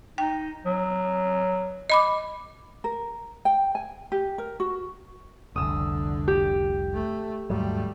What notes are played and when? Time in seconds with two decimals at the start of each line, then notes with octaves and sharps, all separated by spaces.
0.18 D#4 G5
0.66 F#3
1.90 D#5 B5 D6
2.84 A#4
3.45 G5
3.75 G#5
4.12 G4
4.38 A#4
4.60 F#4
5.56 F1 C2 D3 D#6 E6
6.28 G4
6.94 A3
7.50 D#2 G#2 F#3 G3 A3